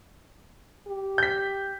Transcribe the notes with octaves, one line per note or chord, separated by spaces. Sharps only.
G4
G6 B6